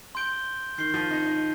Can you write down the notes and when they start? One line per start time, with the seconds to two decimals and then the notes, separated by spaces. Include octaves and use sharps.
0.15 C6 G6 D7 G7
0.78 D#3 G6 C7 G7
0.94 F3
1.11 D#4
1.26 D#4